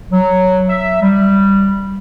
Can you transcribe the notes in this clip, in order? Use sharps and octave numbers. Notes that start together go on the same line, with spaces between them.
F#3
E5
G3